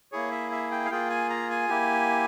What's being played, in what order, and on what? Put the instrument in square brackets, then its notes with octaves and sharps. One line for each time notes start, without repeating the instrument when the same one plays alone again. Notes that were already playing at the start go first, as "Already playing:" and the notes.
[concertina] A#3 E4 G#4 C#5
E5
E5
G5
F5
A#3 F4 G#4 G5
G#5
A#5
G#5
A#3 E4 G4